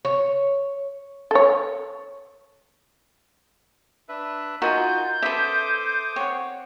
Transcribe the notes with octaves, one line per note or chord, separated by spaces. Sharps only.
C#5
A4 C#5
D4 B4 E5
D#4 F4 F#4 A#4 D#5 G#5 G6
C#4 A4 B4 C5 E5 D6 D#6
C4 C#5 F#5